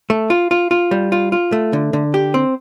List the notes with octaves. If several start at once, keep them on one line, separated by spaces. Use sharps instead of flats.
A3
F4
F4
F4
G3
F4
F4
A3
D3
D3
G4
C4